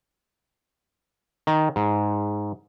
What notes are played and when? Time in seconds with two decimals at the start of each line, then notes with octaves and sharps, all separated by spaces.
1.47 D#3
1.76 G#2